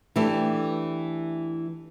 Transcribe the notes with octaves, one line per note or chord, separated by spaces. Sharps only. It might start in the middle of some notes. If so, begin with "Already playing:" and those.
E3 A3 D4 G4